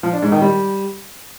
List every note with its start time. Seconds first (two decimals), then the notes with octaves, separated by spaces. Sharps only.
0.03 F3
0.13 D4
0.22 G#2
0.32 D#3
0.42 G3